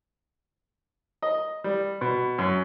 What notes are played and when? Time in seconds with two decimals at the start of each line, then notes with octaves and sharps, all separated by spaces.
1.22 D#5
1.64 G3
2.01 B2
2.38 F#2